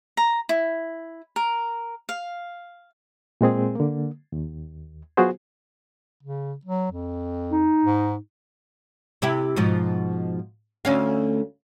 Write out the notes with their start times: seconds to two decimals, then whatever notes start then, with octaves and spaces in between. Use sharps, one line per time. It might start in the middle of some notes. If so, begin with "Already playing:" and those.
0.17 A#5
0.49 E4
1.36 A#4
2.09 F5
3.41 A#2 G#3 C4 G#4
3.75 D3 A#3
4.32 D#2
5.17 F#3 B3 F4 F#4 G#4 C5
6.23 C#3
6.65 F#3
6.91 F2
7.52 D#4
7.84 G#2
9.22 C3 E4 G4
9.56 G#2 B2 F3
10.85 D2 C#4 F5